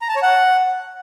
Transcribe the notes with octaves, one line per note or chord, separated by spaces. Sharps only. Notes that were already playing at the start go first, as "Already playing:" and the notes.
A#5
A5
C#5
F#5